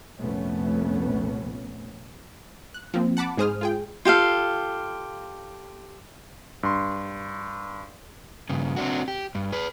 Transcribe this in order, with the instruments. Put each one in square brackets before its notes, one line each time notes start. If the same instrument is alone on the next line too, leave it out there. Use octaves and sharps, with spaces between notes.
[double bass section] C2 F2 A#2 A3 B3 C#4
[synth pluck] F#6
F3 A#3 C4
F#5 A5 B5 D6
G#2 G#3 G#4 C5 D#6 F6
F4 G#4 G5
[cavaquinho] F4 G4 A4 F5
[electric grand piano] G2 C6
[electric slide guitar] G2 C#3
C4 D4 F#4
G4
G2
G#4 B4